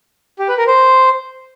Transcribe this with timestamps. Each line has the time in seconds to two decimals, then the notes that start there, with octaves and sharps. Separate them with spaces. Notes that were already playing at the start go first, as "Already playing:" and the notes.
0.39 G4
0.48 B4
0.58 A#4
0.67 C5